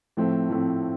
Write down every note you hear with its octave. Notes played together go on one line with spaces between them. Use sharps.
A2 F3 A3 C4
A2 F3 A3 C4